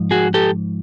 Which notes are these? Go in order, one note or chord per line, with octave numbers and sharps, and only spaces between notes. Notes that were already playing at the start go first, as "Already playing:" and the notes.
Already playing: G#2 F3
F#4 G#4
G4 A4